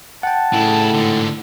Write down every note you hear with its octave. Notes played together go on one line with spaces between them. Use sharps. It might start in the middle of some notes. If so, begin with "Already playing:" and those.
F#5 G5 A5
A2 C#3 E4
G#2 D3